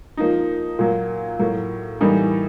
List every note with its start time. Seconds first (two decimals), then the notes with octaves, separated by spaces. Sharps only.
0.17 F3 A#3 D#4
0.79 A#2 F#3 A#3
1.39 A2 F#3 A#3
2.01 A2 E3 G3 A#3 D#4